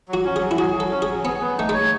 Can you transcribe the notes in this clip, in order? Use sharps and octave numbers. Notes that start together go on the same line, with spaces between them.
F#3
F#4
C#4
G#4
F#3
E4
F#4 G#4
F#3
A4
C#4
G#4
F#3
B3 G#4
B3
A3 D#4
G#3
C#5